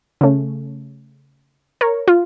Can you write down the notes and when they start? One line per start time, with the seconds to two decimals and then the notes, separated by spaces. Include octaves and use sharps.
0.21 C#3 A3 C#4
1.81 A#4 C#5
2.08 F4